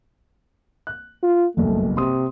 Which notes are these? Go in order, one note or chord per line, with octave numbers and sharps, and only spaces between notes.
F#6
F4
F#1 B1 G2 A3
C3 C6 D#6